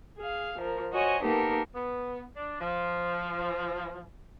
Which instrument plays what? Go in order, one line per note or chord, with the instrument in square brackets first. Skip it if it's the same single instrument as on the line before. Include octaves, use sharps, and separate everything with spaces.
[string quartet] G#4 F5
F3 A#4
F#4 C5 C#5 D#5 G#5
A#3 B3 D#4 G4 A4 A#4
[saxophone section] B3
D4
F3